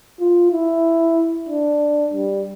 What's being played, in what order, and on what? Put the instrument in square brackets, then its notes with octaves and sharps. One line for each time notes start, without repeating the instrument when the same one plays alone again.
[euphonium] F4
E4
D4
G3